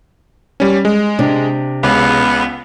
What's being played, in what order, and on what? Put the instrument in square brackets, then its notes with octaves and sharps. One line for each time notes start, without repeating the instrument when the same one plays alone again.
[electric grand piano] G3 C#4
G#3
[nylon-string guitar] C3 D4
[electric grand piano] C#2 C#3 [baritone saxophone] B3